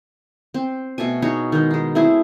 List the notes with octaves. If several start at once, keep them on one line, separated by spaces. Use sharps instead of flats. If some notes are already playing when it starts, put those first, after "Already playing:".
C4
B2 A3 A4 G#5
D#4 F#4 G#4 C#5
D#3 G#3 D#4
G#3 D#4
A3 C4 E4 G#4